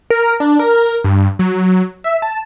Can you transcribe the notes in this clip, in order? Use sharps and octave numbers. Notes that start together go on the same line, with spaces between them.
A#4
D4
A#4
G2
F#3
E5
A5